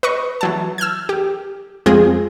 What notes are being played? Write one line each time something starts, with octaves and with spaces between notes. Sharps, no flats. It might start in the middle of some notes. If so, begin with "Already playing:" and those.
B4 D#5 C#6
E3 F#3 A5
E6 F6 G6 G#6
G4
F2 G#3 C4 F4 G#4